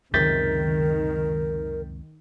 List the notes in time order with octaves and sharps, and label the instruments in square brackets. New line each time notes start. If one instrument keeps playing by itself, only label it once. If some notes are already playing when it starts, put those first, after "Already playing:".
[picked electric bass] C#2 F#2 C3 [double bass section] D#3 [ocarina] A#4 [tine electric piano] G6 A6 B6